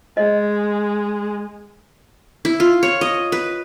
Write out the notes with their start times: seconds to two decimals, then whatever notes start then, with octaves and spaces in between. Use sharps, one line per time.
0.17 G#3 D#5
2.45 E4
2.60 F4
2.83 C#5
3.01 D#5
3.32 B4